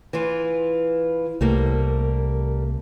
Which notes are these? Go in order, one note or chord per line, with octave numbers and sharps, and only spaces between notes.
E3 F4
C2 G3 A3 A#3